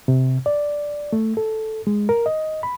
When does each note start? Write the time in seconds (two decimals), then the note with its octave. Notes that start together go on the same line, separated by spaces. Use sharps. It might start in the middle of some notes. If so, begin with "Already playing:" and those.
0.08 C3
0.46 D5
1.13 A3
1.37 A4
1.87 G#3
2.09 A#4
2.26 D#5
2.63 B5